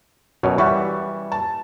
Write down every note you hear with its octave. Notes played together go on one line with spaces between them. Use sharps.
F#2 B2 C#5
E3 G3 E5 F#5 C#6
A5